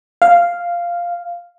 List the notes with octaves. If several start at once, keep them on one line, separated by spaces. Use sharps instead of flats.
F5